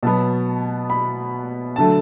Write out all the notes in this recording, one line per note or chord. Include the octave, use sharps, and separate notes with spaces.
B2 F#3 B3 A5
B5
D3 F#3 A3 A5